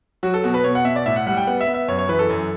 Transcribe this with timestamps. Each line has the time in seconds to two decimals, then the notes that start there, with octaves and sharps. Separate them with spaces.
0.23 F#3 F#4
0.34 A4
0.44 B2 F#4
0.54 B4
0.64 B2 C#5
0.75 F#5
0.85 B2 E5
0.96 D5
1.06 A2 E5
1.16 F#5
1.26 G3 F#5
1.37 G5
1.47 B3 F#5
1.61 E5
1.67 B3
1.74 E5
1.88 F#2 C#5
1.99 C#5
2.09 E3 B4
2.19 A4
2.30 F#2